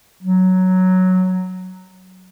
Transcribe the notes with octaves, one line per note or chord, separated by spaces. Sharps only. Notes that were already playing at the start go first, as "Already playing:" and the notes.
F#3